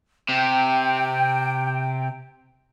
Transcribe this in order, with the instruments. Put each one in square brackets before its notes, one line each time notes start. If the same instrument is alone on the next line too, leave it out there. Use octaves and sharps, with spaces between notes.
[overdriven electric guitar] C3 [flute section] G5